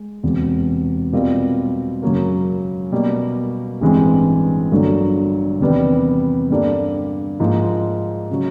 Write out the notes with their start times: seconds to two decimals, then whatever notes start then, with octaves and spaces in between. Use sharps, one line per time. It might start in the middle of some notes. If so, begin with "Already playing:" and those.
Already playing: G#3
0.23 E1 E2 C3
1.12 B2 G3 C4 F4 A#4
2.02 F#2 C#3 F#3 A#3
2.92 B2 G3 A#3
3.81 A1 G2 E3 G#3 C4
4.71 G1 G2 D3 F#3 A#3
5.61 E2 C3 D#3 G3 B3
6.50 G2 D3 G3 A#3 D4
7.39 G#2 F3 A#3
8.31 C#3 F#3